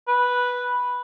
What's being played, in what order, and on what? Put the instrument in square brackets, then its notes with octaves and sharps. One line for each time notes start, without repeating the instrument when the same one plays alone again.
[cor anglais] B4